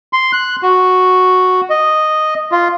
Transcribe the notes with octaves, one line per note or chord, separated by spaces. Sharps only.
C6
F#6
F#4
D#5
F4